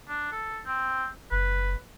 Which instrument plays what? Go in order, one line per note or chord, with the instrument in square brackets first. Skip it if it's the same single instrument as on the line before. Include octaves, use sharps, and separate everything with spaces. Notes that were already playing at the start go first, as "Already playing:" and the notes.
[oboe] D4
A4
C4
[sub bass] F#1 [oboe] B4